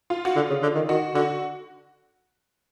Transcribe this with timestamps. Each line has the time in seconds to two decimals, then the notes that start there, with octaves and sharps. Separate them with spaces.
0.10 F4
0.25 F#4
0.36 D3 F4
0.50 C#3
0.63 D3
0.75 D#3
0.88 D#3 F#4
1.15 D3 F#4